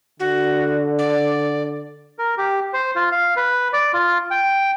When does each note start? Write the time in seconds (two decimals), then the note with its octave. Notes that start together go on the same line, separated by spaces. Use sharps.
0.20 D3 F#4
0.99 D5
2.19 A#4
2.38 G4
2.74 C5
2.96 F4
3.12 F5
3.36 B4
3.73 D5
3.94 F4
4.30 G5